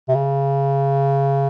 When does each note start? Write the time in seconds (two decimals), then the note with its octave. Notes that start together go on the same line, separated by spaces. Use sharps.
0.08 C3
0.14 C#3